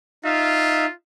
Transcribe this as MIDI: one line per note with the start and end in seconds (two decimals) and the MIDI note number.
0.25 0.86 63
0.25 0.93 65
0.25 0.86 76
0.25 0.86 77